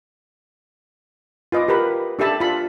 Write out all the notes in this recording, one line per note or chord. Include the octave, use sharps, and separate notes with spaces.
F4 B4 D#5 F5 D6
G4 A#4 B4 B5
D4 G4 A4 E5 A5 B5
F4 B5